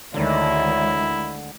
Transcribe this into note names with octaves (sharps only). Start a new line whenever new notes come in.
D2 D3 D#3 G#3 E4 C#5 D5 E5